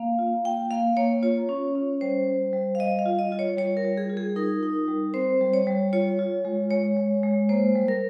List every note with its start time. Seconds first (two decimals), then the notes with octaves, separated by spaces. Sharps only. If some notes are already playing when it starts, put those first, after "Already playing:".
Already playing: A#3 F5
0.19 F4
0.45 A#3 G5
0.71 A#3 F5
0.97 A#3 C#5
1.22 F4 C#5
1.49 C#4
1.75 C#4
2.01 G3 C5
2.27 G3
2.53 G3
2.75 F5
2.79 G3 D#5
2.99 F5
3.06 F4
3.19 D#5
3.32 F4
3.39 C#5
3.57 G3 C#5
3.77 A#4
3.84 G3
3.97 G#4
4.10 F4
4.17 G#4
4.36 D#4 A#4
4.63 D#4
4.88 G3
5.14 C4 C5
5.41 G3
5.53 C#5
5.67 G3
5.93 F4 C#5
6.19 F4
6.45 G#3
6.71 G#3 C#5
6.97 G#3
7.23 G#3
7.49 A#3 C5
7.75 G3
7.88 A#4